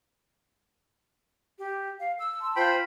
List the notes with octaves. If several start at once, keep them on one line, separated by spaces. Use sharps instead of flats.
G4
F5
E6
A5 C6
F4 C5 G5 B5